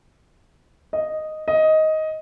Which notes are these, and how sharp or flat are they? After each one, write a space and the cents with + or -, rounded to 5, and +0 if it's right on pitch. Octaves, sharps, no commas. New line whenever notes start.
D#5 -5
D#5 +10